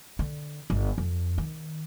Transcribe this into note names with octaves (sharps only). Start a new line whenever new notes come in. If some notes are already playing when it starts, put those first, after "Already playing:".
D3
G1
F2
D#3